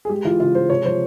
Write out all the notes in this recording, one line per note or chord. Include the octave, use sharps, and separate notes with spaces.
G#4
G#3 G4
E3 F4
C#3 F4
G#3 C5
C3 C#5
F3 C5